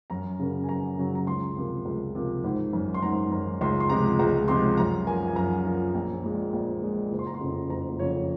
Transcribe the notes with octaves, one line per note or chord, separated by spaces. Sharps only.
F#2 A#5
C#3 F#3 A#3
G#5
F#2 A#5
C#3 F#3 A#3
A#5
C#2 C6
C3 F3 A#3
C#2
C3 F3 A#3
G#1
F#2 D#3
C6
G#1 A#5
F#2 D#3
C#2 C6
C6
C3 F3 G#3 A#5
C#2 A#5
C3 F3 G#3 C6
F#2 A#5
F3 A#3 G#5
G#5
F#2 A#5
F3 A#3
A#1
A#2 G#3
A#1
A#2 G#3
F#1
C6
A#5
C6
F2 C#3 F3
F#1 A#5
F2 C#3 F3 C#5